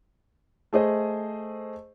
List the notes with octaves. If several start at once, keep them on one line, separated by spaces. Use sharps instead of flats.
A3 G#4 C5 D#5